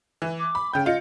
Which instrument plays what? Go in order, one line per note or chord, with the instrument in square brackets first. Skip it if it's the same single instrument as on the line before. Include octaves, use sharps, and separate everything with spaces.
[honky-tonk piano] E3
[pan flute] D6
[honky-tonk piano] B5
[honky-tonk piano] C#3 G6 [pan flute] G5
[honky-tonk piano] F4 C#7 [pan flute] D#5